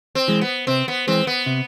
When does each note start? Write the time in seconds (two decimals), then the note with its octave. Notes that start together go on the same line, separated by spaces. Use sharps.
0.15 C4
0.28 E3 G#3
0.41 B3
0.67 C3 C4
0.88 B3
1.08 E3 G#3 C4
1.27 B3
1.46 C3